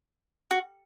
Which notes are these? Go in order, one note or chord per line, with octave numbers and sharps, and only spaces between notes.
F#4